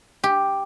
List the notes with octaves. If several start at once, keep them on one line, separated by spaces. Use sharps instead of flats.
G4